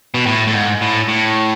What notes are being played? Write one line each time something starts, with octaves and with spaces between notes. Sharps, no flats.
B2
A2
A2
G#2
A2
A2